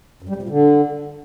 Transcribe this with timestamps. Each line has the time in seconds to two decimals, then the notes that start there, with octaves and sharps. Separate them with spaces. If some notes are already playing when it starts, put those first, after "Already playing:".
0.22 F#2
0.29 G3
0.36 C3
0.42 A#2
0.49 D3